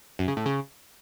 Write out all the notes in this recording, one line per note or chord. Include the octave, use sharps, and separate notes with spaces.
F#2
C#3
A2
C#3